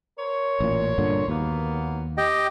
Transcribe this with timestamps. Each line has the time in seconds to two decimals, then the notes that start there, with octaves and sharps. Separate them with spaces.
0.19 A#4 C5 C#5
0.60 A1 A#2
0.98 G2 A#2 D3
1.28 D#2 F#3 A#3 B3
2.17 G4 D#5 G5